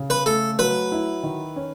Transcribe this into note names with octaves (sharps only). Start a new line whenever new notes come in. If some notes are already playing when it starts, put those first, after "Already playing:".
Already playing: C#3
B4
A3 A4
F#3 B4
E4
D#3
C#4